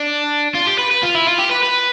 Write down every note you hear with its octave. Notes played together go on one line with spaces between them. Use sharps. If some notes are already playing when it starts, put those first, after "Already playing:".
Already playing: D4
F4
G4
B4
B4
F4
E4
F4
G4
B4
B4